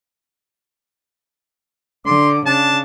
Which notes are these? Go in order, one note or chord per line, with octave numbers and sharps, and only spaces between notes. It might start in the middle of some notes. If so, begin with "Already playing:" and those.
D3 C6 D6
C#3 D4 A5